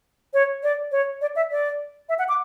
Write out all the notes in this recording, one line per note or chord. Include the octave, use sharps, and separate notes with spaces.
C#5
D5
C#5
D5
E5
D5
E5
F#5
D6